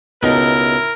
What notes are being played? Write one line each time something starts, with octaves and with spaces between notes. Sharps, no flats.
C#2 B2 D#4 E4 A#4